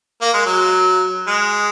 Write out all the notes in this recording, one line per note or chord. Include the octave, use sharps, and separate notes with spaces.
A#3
G#3
F#3
G#3